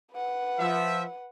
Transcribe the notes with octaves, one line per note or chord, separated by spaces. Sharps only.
B4 F#5
F3 E5